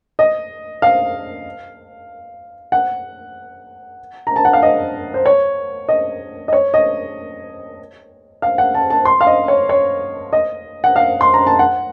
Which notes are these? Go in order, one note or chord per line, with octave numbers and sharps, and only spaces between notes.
D#5
F5
F#5
A#5
A5
F#5
F5
D#5
C5
C#5
D#5
D#5
C#5
D#5
F5
F#5
A5
A5
C6
F5
D#5
C#5
C#5
D#5
F#5
F5
C6
A#5
A5
F#5